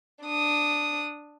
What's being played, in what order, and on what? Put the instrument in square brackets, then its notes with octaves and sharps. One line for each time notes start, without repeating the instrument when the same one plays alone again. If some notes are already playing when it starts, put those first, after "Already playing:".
[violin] D4 D#6